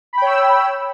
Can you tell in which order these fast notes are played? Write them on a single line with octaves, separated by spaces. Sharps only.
B5 G5 C#5 E6